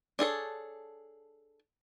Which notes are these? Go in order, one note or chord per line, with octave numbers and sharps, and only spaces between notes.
D4 G#4 A4 C#5